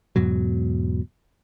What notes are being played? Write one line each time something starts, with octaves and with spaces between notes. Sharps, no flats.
E2 G#2 B2 F#3